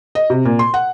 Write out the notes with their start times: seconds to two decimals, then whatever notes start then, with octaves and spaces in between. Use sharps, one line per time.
0.15 D#5
0.30 C3
0.45 A#2
0.59 C6
0.74 F#5